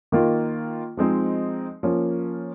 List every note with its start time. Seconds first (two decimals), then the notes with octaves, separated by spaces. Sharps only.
0.12 D#3 A#3 F4
0.97 F3 G#3 C4 D#4
1.83 F3 A#3 C#4